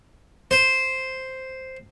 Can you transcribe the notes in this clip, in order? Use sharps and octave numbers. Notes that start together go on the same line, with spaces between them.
C5